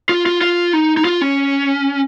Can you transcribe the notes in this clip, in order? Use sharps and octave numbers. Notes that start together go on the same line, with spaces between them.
F4
F4
F4
D#4
D#4
F4
C#4